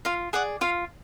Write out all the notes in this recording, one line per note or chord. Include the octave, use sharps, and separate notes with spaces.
F4 F5
G#4 D5 F#5
F4 F5